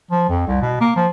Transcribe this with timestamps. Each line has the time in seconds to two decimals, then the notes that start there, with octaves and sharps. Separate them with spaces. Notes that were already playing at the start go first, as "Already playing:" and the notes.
0.11 F3
0.29 F2
0.48 C2
0.61 B2
0.81 A#3
0.96 F3